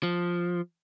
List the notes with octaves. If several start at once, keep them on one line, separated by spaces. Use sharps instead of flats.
F3